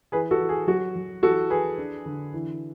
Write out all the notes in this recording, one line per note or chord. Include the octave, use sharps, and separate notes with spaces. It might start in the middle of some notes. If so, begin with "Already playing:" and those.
E3 G#4 B4
F#4 A4
E3
G#4
F#3 F#4
F#3
E3 F#4 A4
E3 G#4 B4
D4
D3
E3